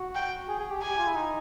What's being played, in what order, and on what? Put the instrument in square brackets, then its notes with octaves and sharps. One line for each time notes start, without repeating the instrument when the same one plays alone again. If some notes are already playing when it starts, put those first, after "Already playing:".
Already playing: [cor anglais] F#4
[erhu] G5
[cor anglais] G#4
G#4
G4
[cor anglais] G#4 [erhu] G#5
[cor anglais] G4
F4
E4
D#4